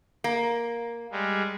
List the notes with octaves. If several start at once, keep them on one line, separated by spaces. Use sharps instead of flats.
A#3
G3 G#3